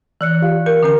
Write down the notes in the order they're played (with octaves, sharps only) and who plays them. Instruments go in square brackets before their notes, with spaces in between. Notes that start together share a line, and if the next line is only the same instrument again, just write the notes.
[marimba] E3 [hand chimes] D5 F#6 C#7
[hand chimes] F4 G4 F5
[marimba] A#4 [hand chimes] C#7
[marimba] D3 C#4 A#4